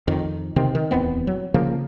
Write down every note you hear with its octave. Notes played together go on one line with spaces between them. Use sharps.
F2 D#3
C3 D#3 C4
D#3
D1 E2 B3 C4
F#3
C#3 F3 A#3